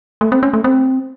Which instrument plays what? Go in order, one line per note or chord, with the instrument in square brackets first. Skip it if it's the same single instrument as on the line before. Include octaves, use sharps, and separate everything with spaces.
[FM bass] A3
C4
C#4
A3
C4